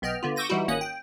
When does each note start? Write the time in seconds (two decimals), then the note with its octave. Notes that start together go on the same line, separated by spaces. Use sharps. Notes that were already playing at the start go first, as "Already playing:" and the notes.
0.02 B1 B3 D#5 G5 F6
0.23 D3 B3 F4
0.36 C#6 D6 E6 G6 A#6 D#7
0.50 E3 G3 D#4 E4 F#4
0.68 G#1 A#3 C#4 D#6 F#6
0.81 G5